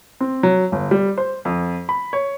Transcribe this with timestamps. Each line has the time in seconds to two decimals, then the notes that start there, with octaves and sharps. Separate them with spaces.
0.20 C4
0.43 F#3
0.72 G1
0.91 G3
1.18 C5
1.45 F2
1.89 B5
2.13 C#5